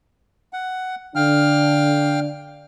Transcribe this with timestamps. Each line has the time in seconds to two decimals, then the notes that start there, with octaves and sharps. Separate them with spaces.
0.53 F#5
1.16 D3 D4 F5 G5 F6